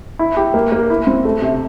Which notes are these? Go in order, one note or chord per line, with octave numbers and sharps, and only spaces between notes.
E4
G4
A#3
A#3
E4
C4
A3
C3